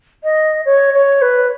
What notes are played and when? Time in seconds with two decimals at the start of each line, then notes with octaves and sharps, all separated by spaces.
0.23 D#5
0.65 C#5
0.93 C#5
1.21 B4